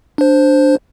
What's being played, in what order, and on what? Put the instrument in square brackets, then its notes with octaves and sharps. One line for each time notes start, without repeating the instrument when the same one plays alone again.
[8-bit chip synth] D4 C5